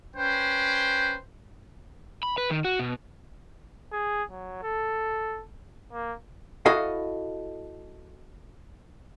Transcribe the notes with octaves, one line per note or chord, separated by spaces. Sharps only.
C#4 B4 C5 G5
B5
B4
D#3
F#4
B2
G#4
F#3
A4
A#3
E4 F#4 A4 D#5 F5